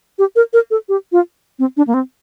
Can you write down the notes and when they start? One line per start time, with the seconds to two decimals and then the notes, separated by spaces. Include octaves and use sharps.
0.19 G4
0.36 A#4
0.53 A#4
0.71 A4
0.89 G4
1.12 F4
1.59 C4
1.77 D4
1.87 A#3
1.94 C4